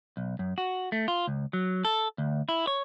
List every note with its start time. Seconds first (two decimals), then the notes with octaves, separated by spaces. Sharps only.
0.17 B1
0.39 F#2
0.58 F#4
0.92 A3
1.08 F4
1.27 C#2
1.53 F#3
1.85 A4
2.18 D2
2.49 E4
2.67 C#5